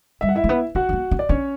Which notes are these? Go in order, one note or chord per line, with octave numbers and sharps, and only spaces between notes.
G3 E5
F#5
E4 E5
A3
B3
C#4 F#4 F#5
C#4
B3
C#4
D5
C#4 D4 C#5